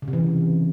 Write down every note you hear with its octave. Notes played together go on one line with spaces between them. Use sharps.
C#3
C3
E3